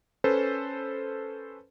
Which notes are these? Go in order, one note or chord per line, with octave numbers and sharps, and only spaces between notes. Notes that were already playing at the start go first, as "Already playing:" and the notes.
C#4 A4 B4 C5